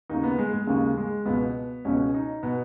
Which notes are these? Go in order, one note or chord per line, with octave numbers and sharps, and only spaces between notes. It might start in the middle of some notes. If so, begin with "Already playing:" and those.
D#2 C#3 D#4
B3
G#3
G#3
D#2 C#3 G#3
G#3
C#2 B2 B3
C#2 B2 C#4
D#4
B2 B3